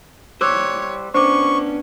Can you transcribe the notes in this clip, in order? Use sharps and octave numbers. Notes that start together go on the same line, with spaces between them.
G3 C5 C#5 D6 E6 F#6
B3 C#4 D4 C5 C#6 D6